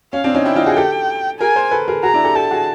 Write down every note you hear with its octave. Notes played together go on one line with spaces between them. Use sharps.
C#4 F5
C4 D4
C#4 D#4
D4 E4 G5
D#4 F4
F#4 G#4
G4 A4
G#4 A#4 G#5
A#4 C5
A4 B4
G#4 A#4
F#4 G#4 A#5
D4 E4
G4 A4
G4 A4 A5
F#4 G#4